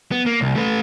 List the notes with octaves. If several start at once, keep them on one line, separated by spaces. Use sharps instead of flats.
B3
A#3
C2
A3 B4